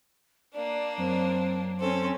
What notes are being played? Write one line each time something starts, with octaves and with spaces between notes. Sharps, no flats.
A#3 D4 D5
F#2 C4
C4 C#4 A4 C5